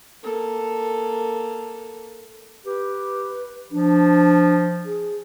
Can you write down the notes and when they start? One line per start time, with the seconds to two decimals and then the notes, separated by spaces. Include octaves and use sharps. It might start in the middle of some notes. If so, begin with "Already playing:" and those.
0.23 A#3 A4
2.66 G4 B4
3.72 F3 D4
4.86 G#4